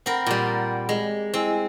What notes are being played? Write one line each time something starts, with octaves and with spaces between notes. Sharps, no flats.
C4 A#4 F#5 B5
A#2 G3
G#3
C4 E4 D#5 G#5